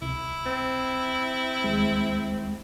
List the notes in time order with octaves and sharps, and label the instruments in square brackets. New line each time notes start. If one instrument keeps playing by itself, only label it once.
[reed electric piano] C2 [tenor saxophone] E4
[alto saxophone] C4
[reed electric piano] D#2 G#3